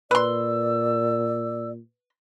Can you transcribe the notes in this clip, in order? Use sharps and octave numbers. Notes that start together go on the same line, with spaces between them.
A#2 B4 D5 C6 E6